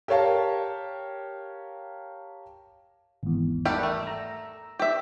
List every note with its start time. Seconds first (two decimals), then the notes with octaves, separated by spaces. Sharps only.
0.08 G4 A#4 C#5 F5 A5
3.23 G#1 E2
3.65 G3 A3 G4 A#4 F#5
3.83 A3
4.03 A#5 E6
4.79 G4 E5